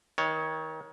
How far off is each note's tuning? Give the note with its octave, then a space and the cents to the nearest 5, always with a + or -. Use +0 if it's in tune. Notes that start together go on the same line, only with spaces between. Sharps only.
D#3 +30 C#5 +0